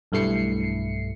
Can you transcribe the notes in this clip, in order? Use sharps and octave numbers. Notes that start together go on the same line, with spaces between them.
B1 G2 A3 E4 C7 C#7